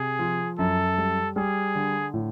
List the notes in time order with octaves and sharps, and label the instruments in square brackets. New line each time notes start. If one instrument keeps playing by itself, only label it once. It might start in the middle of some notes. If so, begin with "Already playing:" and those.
Already playing: [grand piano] C3 [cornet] G#4
[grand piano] F3
[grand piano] F#2 [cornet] A4
[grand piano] G3
[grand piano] G3 [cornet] G#4
[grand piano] D3
A2